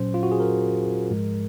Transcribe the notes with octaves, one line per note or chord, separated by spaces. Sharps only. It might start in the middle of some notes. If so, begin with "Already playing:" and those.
Already playing: A#2 F#3 C#4 C5
F4
F#4
G#4
A#4
G#2 F3 G#3